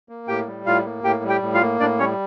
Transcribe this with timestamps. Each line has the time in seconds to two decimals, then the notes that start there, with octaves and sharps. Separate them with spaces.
0.09 A#3
0.28 A2 G4 G5
0.47 G3
0.66 A2 F4 F5
0.85 A#3
1.04 A2 G4 G5
1.23 G3
1.29 G4 G5
1.42 A2
1.54 F4 F5
1.61 A#3
1.80 A2 D4 D5
1.99 G3 C#4 C#5